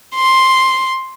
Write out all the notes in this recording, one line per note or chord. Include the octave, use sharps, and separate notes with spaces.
C6